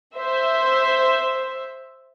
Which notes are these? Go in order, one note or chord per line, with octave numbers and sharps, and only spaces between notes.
C5 E5